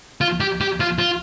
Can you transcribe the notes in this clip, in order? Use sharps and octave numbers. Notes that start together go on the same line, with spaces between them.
F4
G4
G4
F4
F4